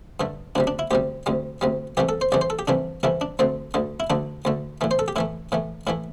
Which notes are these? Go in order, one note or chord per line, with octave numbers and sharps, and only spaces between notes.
G2 D3 A3
D2 C3 G3 D4
D4
E4
D2 C3 G3 G4
D2 C3 G3
D2 C3 G3
C2 C3 E3 A3 G4
A4
C5
C2 C3 E3 A3 D5
C5
A4
G4
C2 C3 E3 A3 D4
C2 C3 E3 A3 E4
D4
D2 D3 A3 C4
D2 D3 A3
E4
D2 D3 A3 D4
D2 D3 A3
A2 E3 A3
C5
A4
G4
A2 E3 A3 E4
A2 E3 A3
A2 E3 A3 E4